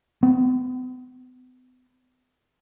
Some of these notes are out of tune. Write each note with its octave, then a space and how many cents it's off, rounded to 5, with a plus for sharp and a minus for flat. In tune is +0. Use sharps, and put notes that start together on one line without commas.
B3 +45